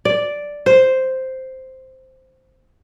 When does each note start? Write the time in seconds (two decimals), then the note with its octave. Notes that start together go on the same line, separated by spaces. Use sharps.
0.05 D5
0.66 C5